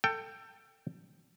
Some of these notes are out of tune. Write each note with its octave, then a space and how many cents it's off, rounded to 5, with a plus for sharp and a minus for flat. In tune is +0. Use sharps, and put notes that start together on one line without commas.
A4 +25 G5 +5